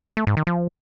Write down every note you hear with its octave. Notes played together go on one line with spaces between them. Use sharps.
A3
G#2
D#3
F3